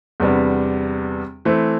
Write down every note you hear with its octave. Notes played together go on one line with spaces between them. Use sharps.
E2 C3 G3 B3 D4
E3 A3 C4